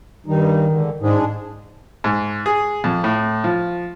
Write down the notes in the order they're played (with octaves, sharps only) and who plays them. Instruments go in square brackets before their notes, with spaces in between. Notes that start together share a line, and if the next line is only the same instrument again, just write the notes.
[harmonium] G2 G3 D#4 [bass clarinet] D#3
[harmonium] G#2 D3
[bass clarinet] G#2 [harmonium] G#3 D4 G#4
[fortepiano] G#2
G#4
F2
A2
F3